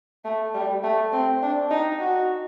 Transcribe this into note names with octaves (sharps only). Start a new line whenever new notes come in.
A3
G3
A3
C4
D4
D#4
F#4